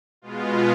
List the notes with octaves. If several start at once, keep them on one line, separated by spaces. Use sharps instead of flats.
B2 G#3 B3 F4